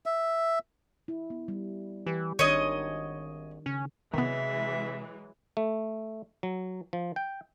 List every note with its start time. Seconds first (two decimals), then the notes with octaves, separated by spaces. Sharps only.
0.06 E5
1.08 E4
1.30 B3
1.48 G3
2.06 E3 G4
2.39 G#1 D#3 D4 C#5 D#5
3.66 C#3 C#4
4.14 C3 D#3 E3 F#3 G#3 B3 E5
5.57 A3
6.43 F#3
6.93 F3
7.16 G5